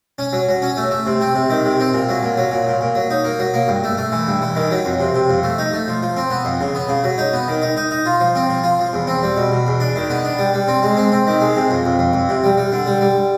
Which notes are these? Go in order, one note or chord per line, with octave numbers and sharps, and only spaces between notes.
C#4
F#3
F#3
C#4
A3
A3
C3
C4
C3
D#3
C3
C4
A#2
F#3
A#2
F#3
A#2
A#2
A#2
F#3
D#4
A#3
F#3
A#3
G2
A3
A3
E3
G2
E3
D#3
F#3
F2
C3
C3
F2
A3
D#4
A3
F3
F3
C4
B3
F2
C#3
B3
C#3
F#3
D#4
B3
D#3
D#4
D#4
D#4
F4
F3
C4
F3
F4
F3
E2
C4
G3
B2
B2
E2
D4
D#3
B3
D4
G3
G3
C4
G#3
C4
C4
D#3
G#3
C3
F2
F2
F2
F2
C3
G3
G3
D3
G3
G3